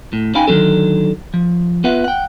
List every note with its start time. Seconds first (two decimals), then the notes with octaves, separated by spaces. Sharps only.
0.13 A2
0.35 C#4 D#4 F5 G5 G#5 B5
0.47 D3 D#3 F#3 C#4 A4
1.34 F3
1.84 B3 F4 B4 E5 F#5
2.04 F#5 G5